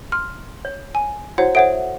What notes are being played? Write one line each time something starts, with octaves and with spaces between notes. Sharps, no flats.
C6 F6
C#5
G#5
E4 F#4 C5 C#5 F#5
A4 C5 C#5 E5 F#5 D7